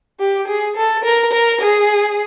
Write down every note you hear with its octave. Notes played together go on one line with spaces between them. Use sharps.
G4
G#4
A4
A#4
A#4
G#4